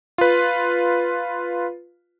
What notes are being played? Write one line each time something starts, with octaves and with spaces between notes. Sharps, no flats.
F4 B4